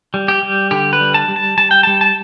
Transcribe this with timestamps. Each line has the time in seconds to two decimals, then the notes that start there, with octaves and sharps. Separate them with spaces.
0.14 G3
0.28 G4
0.43 G3
0.71 D3 G4
0.93 B4
1.00 G3
1.14 A5
1.28 G3
1.36 A5
1.58 G3 A5
1.71 G5
1.83 G3 A5
2.01 A5